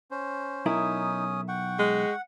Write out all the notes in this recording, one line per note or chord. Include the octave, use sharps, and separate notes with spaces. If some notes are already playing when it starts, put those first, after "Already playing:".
C#4 C5
B1 C#4 D#4 E4 A#4 D#6
F#5 G5 C#6
G#3